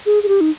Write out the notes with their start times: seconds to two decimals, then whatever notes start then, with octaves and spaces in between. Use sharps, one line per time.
0.06 G#4
0.23 G#4
0.28 G4
0.41 D#4